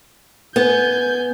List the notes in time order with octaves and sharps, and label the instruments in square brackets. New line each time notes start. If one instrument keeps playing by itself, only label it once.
[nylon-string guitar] B3 [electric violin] G#5 G6